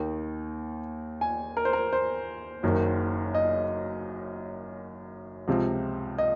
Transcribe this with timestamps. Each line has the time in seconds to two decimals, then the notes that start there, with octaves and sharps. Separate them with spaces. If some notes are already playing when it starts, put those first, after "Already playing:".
Already playing: D#2 D#3
1.21 G#5
1.57 A#4
1.65 C5
1.73 A#4
1.93 C5
2.63 F#1 F#2 D#3
3.35 D#5
5.48 C#2 C3 F3
6.18 D#5